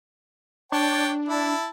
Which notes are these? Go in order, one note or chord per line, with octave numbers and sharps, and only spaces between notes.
D4 C#5 G5 A5
E4 A5